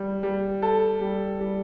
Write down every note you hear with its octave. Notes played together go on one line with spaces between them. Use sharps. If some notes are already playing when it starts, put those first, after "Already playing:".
Already playing: G3
G3
A4
G3
G3